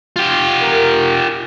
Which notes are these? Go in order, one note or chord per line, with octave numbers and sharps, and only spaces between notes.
F4 G4
A#4